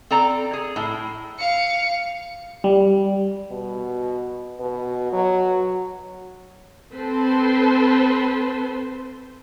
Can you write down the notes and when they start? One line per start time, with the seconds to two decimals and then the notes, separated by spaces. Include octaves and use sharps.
0.11 C4 A4 D5 A#5
0.53 G#4
0.76 A2
1.39 F5 C#7
2.64 G3
3.51 B2
4.60 B2
5.13 F#3
6.92 C4 A4 B4 C5 A5 C6